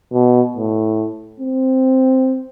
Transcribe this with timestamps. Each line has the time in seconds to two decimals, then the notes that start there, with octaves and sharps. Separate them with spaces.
0.13 B2
0.56 A2
1.40 C4